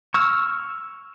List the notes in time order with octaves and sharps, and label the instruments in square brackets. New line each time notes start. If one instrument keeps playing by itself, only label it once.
[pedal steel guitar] C#6 E6 F6